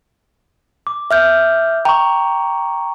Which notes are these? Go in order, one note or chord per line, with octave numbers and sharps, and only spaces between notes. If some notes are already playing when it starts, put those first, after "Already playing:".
D6
E5 F6 G6
G5 A#5 C#6